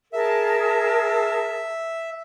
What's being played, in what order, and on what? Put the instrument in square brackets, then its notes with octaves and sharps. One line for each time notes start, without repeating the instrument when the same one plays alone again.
[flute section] G#4 A#4 A5 [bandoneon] E5